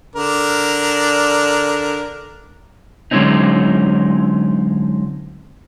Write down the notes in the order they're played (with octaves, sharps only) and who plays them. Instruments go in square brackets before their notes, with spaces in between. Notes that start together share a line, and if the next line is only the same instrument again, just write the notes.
[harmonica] D3 D4 A#4
[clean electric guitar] D3 F#3 G#3 C4 C#4 D#4